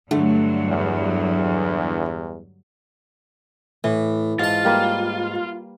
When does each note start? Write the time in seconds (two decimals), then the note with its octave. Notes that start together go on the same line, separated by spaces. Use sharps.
0.11 G2 D3 F#3 A3
0.65 E2 G3
3.84 A2 E3
4.40 G#2 F4 A5
4.65 G3 A#3 B4